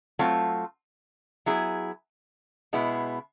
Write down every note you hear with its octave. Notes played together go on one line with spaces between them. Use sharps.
F#3 A3 C4 F4
F#3 B3 E4 G#4
B2 G#3 B3 E4